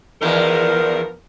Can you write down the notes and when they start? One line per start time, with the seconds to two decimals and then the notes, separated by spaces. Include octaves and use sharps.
0.21 E2 D#3 F3 B3 A#4